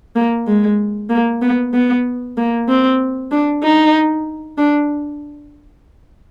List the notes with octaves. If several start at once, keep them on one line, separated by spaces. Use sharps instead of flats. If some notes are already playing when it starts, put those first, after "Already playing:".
A#3
G#3
A#3
B3
B3
A#3
C4
D4
D#4
D4